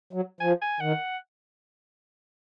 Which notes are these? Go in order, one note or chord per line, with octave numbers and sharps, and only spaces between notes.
F#3
F3 G#5
G#5
D#3 F#5